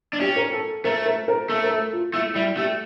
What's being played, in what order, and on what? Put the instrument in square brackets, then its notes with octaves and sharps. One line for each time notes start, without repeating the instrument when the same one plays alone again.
[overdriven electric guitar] D4
[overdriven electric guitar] C#4 [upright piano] G4
[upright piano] A#4
A4
[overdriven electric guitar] A3 [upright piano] A#4
[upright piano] A#4
A#4
[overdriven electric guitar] A3 [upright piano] A4
[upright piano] A#4
A4
F4
[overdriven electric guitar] A3 [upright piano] E4
[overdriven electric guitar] G3 [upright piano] E4
[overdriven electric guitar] A3 [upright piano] G4